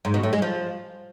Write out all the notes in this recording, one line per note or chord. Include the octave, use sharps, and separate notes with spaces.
G#2
B2
A2
G#3
F3